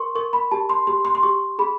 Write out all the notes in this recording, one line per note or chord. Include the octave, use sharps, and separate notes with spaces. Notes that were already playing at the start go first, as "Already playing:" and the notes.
Already playing: A#4 C6 C#6
A#4 C#6
B5
G4 A5
C6
G4 C6
C6
C6
G4 C#6
G#4 B5